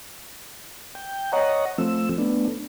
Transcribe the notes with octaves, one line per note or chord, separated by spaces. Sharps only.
G5
C#5 D#5 F#5 A#5
F3 A3 C4 E6
A3 B3 D4